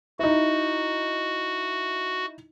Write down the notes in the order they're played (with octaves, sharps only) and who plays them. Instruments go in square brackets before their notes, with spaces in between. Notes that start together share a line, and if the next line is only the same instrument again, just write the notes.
[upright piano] D#4 E4 [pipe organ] F#4